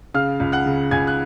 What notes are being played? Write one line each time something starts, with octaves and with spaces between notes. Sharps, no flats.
C#3 F5 F6
C#2
F#5 F#6
C#3
C#2 G#5 G#6
F#6